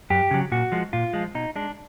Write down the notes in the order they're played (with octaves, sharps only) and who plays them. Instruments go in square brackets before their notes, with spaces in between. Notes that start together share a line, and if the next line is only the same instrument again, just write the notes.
[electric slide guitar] F#2 G4
C#3 F#3
A#2 F#4
F3 G#3
A#2 F4
F3 G#3
B2 D#4
G#3 D4